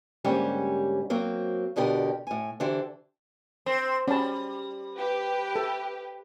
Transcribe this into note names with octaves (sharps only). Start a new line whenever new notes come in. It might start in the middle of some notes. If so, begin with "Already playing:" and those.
G#2 D3 G3 A#3 C#4 G4
F#3 A#3 C4
E2 B2 D3 G4 A#4
A2 G#5
D3 E3 G4 A4 C5
C4
G3 C#4 A5
G4 B4
A4